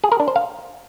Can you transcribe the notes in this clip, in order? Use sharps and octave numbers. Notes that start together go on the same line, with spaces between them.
G#4
A#4
D4
C5
F5